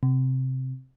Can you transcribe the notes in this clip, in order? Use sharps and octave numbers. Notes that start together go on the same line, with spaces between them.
C3